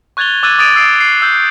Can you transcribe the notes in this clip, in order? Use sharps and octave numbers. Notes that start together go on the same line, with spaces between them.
C#6 F#6 G#6 A6 F7 G7
D6 E6 F#6 G#6 A6 D#7
D6 D#6 A6 D7 D#7
D#6 E6 C7 D7
C7
E6 G6